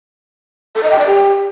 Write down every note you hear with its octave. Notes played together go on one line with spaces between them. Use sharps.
A4
D#5
G5
D5
G4